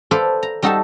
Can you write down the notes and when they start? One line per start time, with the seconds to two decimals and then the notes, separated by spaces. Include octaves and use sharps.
0.11 A4 B4 C5 D5 F5
0.43 A#5
0.62 G3 D#4 F#4 A4 E5 A5